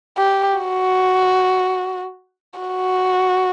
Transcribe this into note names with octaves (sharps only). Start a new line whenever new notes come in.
G4
F#4
F#4